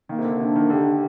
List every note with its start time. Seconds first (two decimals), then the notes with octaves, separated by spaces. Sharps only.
0.09 D#3 A#3
0.18 C3
0.25 D3
0.40 C3 D4
0.56 D#3
0.70 D3 G4